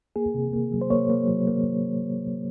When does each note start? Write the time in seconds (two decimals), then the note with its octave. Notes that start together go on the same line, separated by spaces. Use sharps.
0.16 A#3 G#4
0.34 C3
0.53 A#3
0.72 F#3
0.81 C5
0.90 A#3 C#5
1.10 A#3
1.28 F#3
1.47 A#3